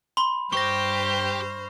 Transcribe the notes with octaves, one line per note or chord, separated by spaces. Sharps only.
B5 C6 G7
G2 G4 C5 C#6 F6 A#6